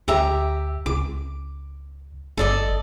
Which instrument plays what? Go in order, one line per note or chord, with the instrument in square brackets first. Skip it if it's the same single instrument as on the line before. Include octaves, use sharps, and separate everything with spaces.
[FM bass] D2 [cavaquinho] G4 E5 A#5
[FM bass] C#2 [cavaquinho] D6
[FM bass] G1 [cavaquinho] A4 D5 D#5